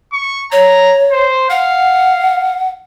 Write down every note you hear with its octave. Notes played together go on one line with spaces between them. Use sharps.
C#6
C#5 A#5
C5
F5 F#5